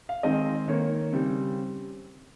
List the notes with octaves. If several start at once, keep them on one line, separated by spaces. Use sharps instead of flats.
F5
D#3 G#3 C4 D#5
D#3 A#3 C#5
C#3 G3 C4